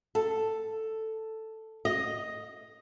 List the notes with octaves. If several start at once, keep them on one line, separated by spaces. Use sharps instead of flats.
A4
D#5